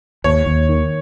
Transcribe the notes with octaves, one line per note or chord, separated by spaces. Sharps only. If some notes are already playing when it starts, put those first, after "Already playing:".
D#2 C#5
D#2
D#3